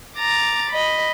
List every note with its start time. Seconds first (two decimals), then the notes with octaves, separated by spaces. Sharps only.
0.18 A#5 D6 A6
0.70 D#5 B5